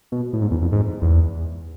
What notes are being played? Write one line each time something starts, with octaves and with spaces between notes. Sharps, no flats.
B2
A2
G#2
E2
F2
G#2
E2